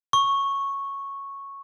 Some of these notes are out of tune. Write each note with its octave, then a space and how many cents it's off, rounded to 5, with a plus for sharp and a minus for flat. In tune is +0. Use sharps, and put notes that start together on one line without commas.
C#6 -5